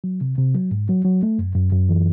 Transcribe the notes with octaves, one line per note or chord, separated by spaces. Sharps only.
F#3
C3
C3
F#3
G#2
F#3
F#3
A3
F#2
F#2
F#2
E3